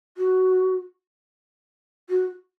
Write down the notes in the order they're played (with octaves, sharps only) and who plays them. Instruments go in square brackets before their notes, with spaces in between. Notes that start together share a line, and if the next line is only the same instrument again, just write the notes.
[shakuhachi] F#4
F#4